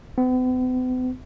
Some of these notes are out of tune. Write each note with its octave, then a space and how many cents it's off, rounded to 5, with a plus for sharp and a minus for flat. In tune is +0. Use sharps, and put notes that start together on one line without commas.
B3 +45